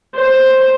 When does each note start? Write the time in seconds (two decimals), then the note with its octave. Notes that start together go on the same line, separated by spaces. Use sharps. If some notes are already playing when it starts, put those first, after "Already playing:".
0.15 C5